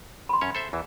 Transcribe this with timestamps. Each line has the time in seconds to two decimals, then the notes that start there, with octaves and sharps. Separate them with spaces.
0.29 B5 C6
0.41 F#2 C#4 C#5
0.55 A4 C5 E5
0.73 E2 E3